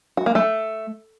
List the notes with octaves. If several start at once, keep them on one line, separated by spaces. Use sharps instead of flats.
F#4
A#3
A3